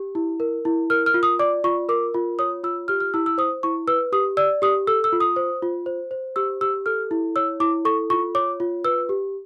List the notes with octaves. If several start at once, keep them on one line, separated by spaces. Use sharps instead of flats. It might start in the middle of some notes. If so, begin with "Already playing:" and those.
Already playing: G4
E4
A#4
E4
A#4 F6
F6
F4
D#6
D5 D6
F4 C#6
A#4 D6
F4
C#5 D#6
F4 E6
G4 F6
F6
E4 E6
E6
C5 D#6
E4 C#6
B4 E6
G4 D#6
D5 E6
G4 D#6
A4 E6
E6
F4
D#6
C5
F4
C5
C5
G4 E6
G4 E6
A4 F6
E4
C#5 E6
E4 D6
A4 C#6
F4 C#6
C#5 D6
F4
B4 E6
G4